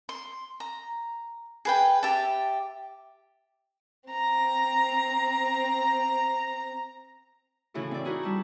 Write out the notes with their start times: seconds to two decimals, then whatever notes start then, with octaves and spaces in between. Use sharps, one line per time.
0.09 C6
0.60 A#5
1.65 G#4 B4 G5
2.03 G4 E5 A5
4.09 C4 A#5
7.74 A2 C#3 E3 E4 F#4 A4
7.91 C4 D5
8.05 D#4 E4 F#4 G#4 A#4
8.23 G3 A5